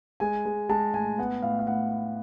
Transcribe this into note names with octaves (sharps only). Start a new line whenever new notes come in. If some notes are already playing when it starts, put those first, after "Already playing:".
G#3 G#5
G#3
G#3 A5
A2 G#5
B3 F#5
A2 F5
F5
A2 F#5